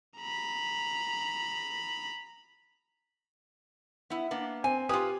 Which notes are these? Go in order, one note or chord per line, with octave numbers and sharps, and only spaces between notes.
A#5 B5
B3 E4
A#3 B3 D4
C4 G#5
F4 G4 B4 G#5 D#6